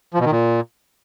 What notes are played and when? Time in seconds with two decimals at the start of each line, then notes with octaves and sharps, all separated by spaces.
0.14 F3
0.20 B2
0.26 D#3
0.31 A#2